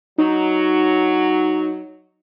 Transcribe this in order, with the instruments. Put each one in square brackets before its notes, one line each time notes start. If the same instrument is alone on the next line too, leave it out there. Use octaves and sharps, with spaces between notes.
[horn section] F#3 [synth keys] D#4